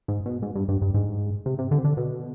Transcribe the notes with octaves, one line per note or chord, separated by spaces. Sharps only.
G#2
B2
G#2
G2
G2
G2
G#2
C3
C3
D3
C3
D3
B2